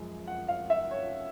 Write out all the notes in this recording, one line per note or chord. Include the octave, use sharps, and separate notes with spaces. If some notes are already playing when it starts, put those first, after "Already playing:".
Already playing: F#2 C#3 F3 G#3
F#5
F5
E5
C#5